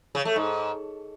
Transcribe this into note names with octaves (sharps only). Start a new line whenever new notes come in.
C#3
A3
G#2